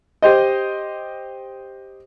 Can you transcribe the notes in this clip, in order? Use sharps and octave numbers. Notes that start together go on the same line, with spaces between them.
G4 C5 D#5